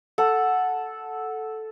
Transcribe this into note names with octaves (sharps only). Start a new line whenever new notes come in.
A4 F#5